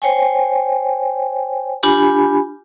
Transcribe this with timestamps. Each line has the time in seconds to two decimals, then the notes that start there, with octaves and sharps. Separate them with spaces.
0.02 C5 C#5 G5 G#5
1.83 D4 F4 G4 G#5 B5